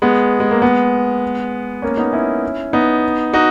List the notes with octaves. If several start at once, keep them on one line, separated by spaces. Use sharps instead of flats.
G#3 B3
G#3
A#3
G#3 B3
A#3 C#4
B3 D#4
C#4 E4
B3 D#4
D#4 F#4